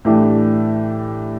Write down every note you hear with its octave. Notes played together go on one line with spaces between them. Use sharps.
A2 E3 A3 D4 G4